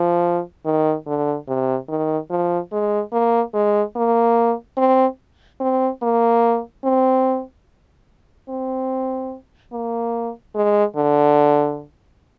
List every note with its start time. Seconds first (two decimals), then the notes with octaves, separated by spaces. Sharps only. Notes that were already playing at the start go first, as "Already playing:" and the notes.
Already playing: F3
0.65 D#3
1.07 D3
1.48 C3
1.89 D#3
2.30 F3
2.72 G#3
3.12 A#3
3.54 G#3
3.96 A#3
4.77 C4
5.60 C4
6.02 A#3
6.84 C4
8.49 C4
9.72 A#3
10.55 G#3
10.96 D3